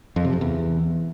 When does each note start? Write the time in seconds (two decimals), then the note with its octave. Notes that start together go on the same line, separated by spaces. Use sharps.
0.16 F2
0.25 C3
0.33 F2
0.41 E2